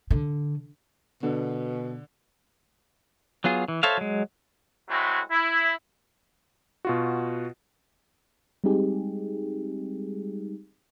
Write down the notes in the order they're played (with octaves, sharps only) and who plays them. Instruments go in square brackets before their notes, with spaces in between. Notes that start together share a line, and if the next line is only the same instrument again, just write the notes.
[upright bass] D3
[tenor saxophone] B2 [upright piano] D3
[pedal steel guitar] F#3 B3 F4 G#4
E3
A4 C5 C#5 E5 F5
F#3 G#3
[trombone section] F#3 G#3 A3 C4 E4 F#4
E4
[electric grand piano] B2 F4 F#4
[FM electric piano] G3 G#3 C4 D#4 G4 G#4